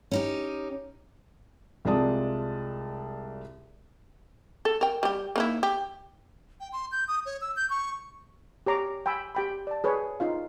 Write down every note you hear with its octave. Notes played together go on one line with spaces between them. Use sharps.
C#4 D#4 G4
C2 G#3 F4 D5 A5 D#6
A4
A#4 G5
G3 G4
A#3 D#4 E4
G4
G5
C6
G6
D#6
C#5
E6
G6
C#6
G4 C#5 A#5 D6
G5 G#5 B5 E6
G4 G5 B5
D5 A5
G#4 B4 C#5
D#4 F4 F5